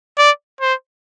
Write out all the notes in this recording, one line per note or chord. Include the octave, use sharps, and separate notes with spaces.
D5
C5